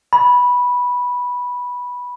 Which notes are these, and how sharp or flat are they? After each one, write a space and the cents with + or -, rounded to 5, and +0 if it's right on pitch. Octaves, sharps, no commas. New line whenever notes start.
B5 -10